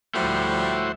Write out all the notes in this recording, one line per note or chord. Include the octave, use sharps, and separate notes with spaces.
D2 F3 G3 A3 E4 F#4 C5